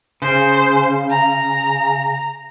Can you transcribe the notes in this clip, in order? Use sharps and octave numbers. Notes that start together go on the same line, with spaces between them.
C#3 C5
A#5